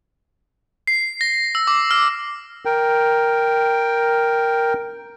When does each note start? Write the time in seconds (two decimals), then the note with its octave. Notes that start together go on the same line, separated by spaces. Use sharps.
0.87 C7
1.21 A#6
1.55 E6
1.67 D6
1.91 F6
2.65 A#4 G5